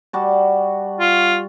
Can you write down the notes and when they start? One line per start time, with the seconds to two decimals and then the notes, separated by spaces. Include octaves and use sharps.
0.13 G3 F#4 A5
1.00 F4